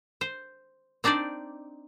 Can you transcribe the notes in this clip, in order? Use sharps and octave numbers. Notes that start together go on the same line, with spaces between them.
C5
C4 D4 D#4 C5 D5